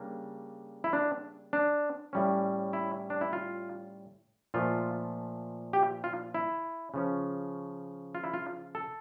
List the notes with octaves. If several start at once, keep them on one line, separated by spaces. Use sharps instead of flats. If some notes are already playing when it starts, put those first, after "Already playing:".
Already playing: C#3 G3 A#3 D4
E4
D4
D4
A2 G3 C#4
E4
D4
E4
F4
A#2 F3 A3 F4
G4
F4
E4
C#3 F3 C#4
F4
E4
F4
A4